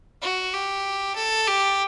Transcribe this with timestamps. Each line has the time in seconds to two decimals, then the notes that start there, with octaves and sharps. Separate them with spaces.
0.22 F#4
0.54 G4
1.16 A4
1.47 G4